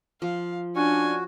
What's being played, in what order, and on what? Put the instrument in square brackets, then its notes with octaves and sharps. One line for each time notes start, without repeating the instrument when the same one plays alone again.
[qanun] F3 [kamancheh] F5
[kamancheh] C#4 G#5 [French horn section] D4 [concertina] F#4